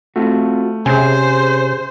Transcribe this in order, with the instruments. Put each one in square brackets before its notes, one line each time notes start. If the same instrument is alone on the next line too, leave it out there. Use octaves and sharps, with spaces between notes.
[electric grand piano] A3 [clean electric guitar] C4 F4 F#4
[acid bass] C3 [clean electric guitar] C#4 G#4 [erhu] C5 [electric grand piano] G#5